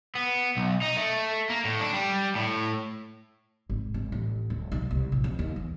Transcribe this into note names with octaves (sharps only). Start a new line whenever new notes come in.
B3
B1
D#4
A3
A#3
A2
D4
G3
A2
G#1
G#1
A1
D1
B1
C2
A#1
F2
D#2
E2